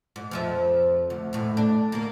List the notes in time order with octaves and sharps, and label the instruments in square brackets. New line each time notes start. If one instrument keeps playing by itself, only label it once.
[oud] G#2
F2 F3 E5
D2
E2 A2
D4
D2 A#3